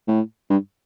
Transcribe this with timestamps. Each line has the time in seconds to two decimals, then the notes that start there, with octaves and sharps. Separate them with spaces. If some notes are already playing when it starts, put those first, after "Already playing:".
0.07 A2
0.50 G2